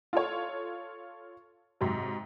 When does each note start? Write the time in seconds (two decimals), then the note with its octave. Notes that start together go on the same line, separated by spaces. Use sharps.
0.13 F4 A4 C#5
1.81 G#2 C3 F#3